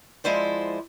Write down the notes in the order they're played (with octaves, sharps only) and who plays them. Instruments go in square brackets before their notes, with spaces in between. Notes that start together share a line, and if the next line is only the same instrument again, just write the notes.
[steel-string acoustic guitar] F3 G#3 E4 C5 D5